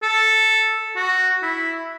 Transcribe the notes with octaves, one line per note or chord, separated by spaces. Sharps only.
A4
F#4
E4